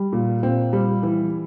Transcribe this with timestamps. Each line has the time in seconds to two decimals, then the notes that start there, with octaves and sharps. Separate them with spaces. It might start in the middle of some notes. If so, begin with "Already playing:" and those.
Already playing: G3
0.13 A#2
0.43 A#2 C4
0.73 G3
1.03 E3